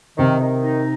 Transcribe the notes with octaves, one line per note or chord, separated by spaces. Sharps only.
C3 D#3
D#3
D#4